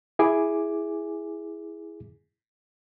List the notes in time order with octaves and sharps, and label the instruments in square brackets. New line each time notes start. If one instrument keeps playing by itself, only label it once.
[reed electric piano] E4 G#4 G#5 D6